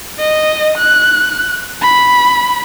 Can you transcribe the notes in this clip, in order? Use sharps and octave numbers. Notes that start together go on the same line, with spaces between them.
D#5
F#6
B5